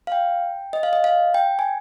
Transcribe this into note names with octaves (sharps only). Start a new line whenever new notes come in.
F5
G5
D#5
F5
D#5
F5
G5
G#5